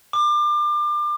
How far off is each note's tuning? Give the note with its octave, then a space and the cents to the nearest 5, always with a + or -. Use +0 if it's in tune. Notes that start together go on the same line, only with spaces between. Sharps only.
D6 +30